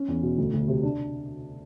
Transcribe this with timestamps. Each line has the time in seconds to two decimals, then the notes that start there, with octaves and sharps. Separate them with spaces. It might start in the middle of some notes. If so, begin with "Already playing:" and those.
Already playing: C#4
0.08 E2
0.23 B2
0.38 D2
0.53 D2
0.68 C3
0.83 D4